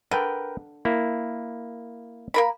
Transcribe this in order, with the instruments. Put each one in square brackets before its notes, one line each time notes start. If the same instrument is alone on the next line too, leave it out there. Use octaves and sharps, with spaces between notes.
[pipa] D3 [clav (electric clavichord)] A#4 B4 G5
[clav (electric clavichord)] A#3 E4
[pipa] A#3 A#4 B5